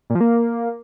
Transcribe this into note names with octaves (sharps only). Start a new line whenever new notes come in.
A#2
F3
A#3